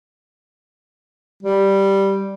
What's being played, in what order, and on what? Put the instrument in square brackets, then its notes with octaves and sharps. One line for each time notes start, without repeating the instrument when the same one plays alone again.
[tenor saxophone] G3